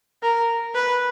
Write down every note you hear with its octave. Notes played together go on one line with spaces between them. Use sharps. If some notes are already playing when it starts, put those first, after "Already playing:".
A#4
B4